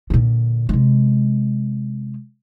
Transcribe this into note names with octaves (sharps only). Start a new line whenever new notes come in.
A#2 D3
C3 G#3